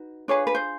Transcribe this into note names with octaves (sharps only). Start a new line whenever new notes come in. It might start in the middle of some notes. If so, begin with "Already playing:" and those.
Already playing: D#4 F#4 B4
D4 F4 G#4 B4 C#5
B4
C5